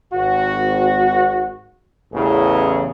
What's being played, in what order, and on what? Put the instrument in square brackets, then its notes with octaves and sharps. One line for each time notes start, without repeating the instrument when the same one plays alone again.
[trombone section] G#1 F#4
A1 E2 C#3 G#4